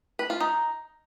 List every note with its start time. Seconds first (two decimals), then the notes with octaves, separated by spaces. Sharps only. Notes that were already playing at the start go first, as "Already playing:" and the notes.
0.19 B4
0.30 F4
0.40 D#4